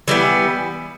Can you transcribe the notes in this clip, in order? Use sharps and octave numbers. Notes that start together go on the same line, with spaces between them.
E3 G3 B3